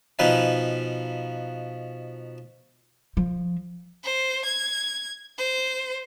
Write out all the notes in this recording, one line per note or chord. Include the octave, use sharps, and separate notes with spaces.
B2 F3 D#4 B4 F5 G#5
F3
C5
G#6
C5